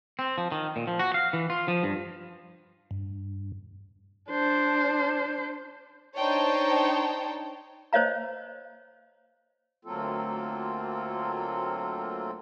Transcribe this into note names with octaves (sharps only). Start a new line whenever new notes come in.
C4
F3
D#3
A#2
F3
F#4
F5
E3
F4
F3
G2
G2
D4 C5
D4 D#4 C5 C#5 G5 A5
C5 C#5 D#5 F5 A#5
D2 F#3 A#3 C4 F4 A4